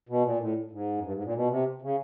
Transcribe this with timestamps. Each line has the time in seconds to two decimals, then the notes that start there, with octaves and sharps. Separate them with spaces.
0.09 B2
0.24 A#2
0.39 A2
0.71 G#2
0.98 F#2
1.03 G2
1.14 G#2
1.24 A#2
1.34 B2
1.50 C3
1.82 C#3